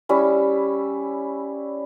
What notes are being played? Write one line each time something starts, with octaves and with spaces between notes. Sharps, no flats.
G3 C#4 E4